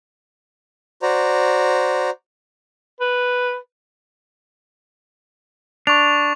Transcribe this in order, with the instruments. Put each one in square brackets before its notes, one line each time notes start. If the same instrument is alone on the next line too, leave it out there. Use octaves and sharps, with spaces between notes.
[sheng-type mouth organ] F#4 C5 D5 A#5
[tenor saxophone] B4
[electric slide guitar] D4 [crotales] C#6 F7